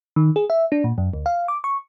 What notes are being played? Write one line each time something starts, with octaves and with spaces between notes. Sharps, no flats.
D#3
G#4
E5
D4
A#2
F#2
D2
F5
D6
C#6